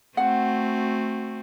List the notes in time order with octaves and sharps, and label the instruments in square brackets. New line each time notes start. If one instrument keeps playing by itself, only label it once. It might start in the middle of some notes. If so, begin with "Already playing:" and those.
[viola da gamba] A3 C4 F#4 [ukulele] F#5